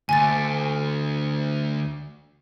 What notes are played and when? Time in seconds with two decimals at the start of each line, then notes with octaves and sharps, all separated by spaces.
0.09 D2 G#5 A6